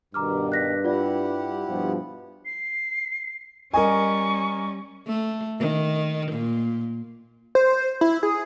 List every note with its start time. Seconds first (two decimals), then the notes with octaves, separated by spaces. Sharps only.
0.14 G2 B2 D#3 A#5 D6 F6
0.52 F#6 A#6 B6
0.85 E4 F4 G4 D5 F#5
1.69 G2 B2 F3
2.45 C7
3.74 G3 C#4 A#4 D#5 G#5 C#6
5.07 A3
5.59 D#3
6.32 A#2
7.55 C5
8.01 E4
8.23 G#4